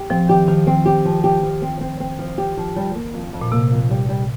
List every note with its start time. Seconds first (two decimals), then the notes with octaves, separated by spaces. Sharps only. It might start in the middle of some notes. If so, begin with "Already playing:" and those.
Already playing: G4
0.10 F3 C4
0.29 D#3 G4
0.48 D#3 F3
0.67 C4
0.86 G4
1.05 F3
1.24 G4
1.43 F3
1.62 C4
1.81 C4
2.00 C4
2.19 F3
2.38 G4
2.57 F3
2.76 G3
2.95 A#3
3.14 F2
3.33 F2
3.41 A#2
3.52 C3 A#3
3.71 F2
3.90 G3
4.09 G3